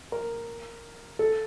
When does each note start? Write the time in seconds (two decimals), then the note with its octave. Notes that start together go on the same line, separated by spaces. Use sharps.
0.12 A#4
1.19 A4